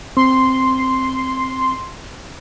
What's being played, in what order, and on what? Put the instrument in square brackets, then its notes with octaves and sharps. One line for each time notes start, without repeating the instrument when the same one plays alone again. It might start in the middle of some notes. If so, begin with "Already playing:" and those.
[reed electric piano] C4 [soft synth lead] C6